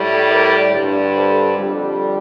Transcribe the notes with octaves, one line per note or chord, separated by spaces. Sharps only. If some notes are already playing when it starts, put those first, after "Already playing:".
Already playing: A2 G3
A#4 D5
G2 D3 G3
A4 C5
F2 D3 G3